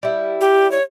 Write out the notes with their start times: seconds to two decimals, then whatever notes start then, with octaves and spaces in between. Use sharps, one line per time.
0.03 G3 E4
0.41 G4
0.72 C#5